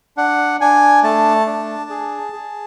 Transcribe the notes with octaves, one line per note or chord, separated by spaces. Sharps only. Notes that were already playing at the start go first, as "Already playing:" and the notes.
D4 F#5
D4 G#5
A3 A5
D4
G#4
G#4